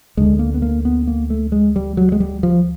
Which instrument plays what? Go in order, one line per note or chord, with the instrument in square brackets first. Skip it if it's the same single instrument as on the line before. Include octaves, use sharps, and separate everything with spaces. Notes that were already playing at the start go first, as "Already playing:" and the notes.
[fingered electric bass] D2 D3 G#3
A#3
B3
A#3
B3
A#3
A3
G#3
G3
F#3
G#3
G3
F3